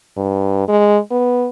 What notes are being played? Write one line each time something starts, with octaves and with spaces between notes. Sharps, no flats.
G2
G#3
B3